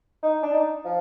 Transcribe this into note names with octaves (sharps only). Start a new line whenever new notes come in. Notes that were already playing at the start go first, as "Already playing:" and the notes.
D#4
D4
D#4
F3